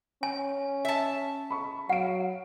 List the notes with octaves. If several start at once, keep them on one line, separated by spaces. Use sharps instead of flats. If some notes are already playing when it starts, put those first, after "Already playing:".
C#4 G#5
E5 A5
B5 C#6
F#3 F5 F#5 D7